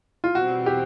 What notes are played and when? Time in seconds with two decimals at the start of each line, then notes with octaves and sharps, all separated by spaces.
0.24 F4
0.35 E2 B2 G3 C4 F#4
0.66 G4